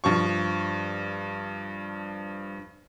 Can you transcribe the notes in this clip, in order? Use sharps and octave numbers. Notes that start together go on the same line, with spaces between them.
G2 F3 C#6